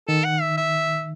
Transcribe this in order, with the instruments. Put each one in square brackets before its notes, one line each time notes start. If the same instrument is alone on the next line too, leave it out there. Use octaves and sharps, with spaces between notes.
[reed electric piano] D#3 [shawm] A4
[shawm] F#5
E5
E5